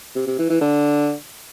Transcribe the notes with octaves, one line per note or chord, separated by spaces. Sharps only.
C3
C3
E3
E3
D3